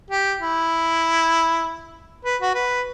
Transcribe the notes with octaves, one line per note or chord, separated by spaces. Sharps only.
G4
E4
B4
F#4
B4